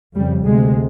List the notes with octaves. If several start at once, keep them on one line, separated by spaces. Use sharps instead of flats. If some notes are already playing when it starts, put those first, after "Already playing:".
F2 C#3 G3
D2 C3 G#3